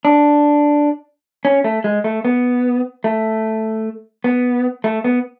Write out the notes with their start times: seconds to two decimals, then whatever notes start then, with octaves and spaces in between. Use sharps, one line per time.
0.05 D4
1.45 C#4
1.64 A3
1.84 G#3
2.04 A3
2.25 B3
3.04 A3
4.24 B3
4.84 A3
5.04 B3